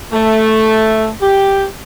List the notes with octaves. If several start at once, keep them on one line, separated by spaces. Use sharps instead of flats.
A3
G4